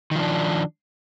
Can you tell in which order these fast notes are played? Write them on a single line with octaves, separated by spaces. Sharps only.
D#3 F3 D4